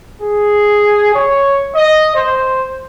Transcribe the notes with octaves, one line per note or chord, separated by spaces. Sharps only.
G#4
C#5
D#5
C5